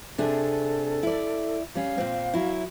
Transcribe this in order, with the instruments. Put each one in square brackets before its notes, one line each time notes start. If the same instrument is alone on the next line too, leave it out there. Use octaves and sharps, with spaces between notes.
[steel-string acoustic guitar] C3 D4 G#4 [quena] A4
[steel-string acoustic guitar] E4 D5
[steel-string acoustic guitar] G3 C#4 [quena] F5
[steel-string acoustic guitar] A#2 C4
F#3 E4